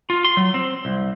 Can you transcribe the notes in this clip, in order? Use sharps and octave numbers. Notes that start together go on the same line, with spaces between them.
F4
C6
F#3
C4
C2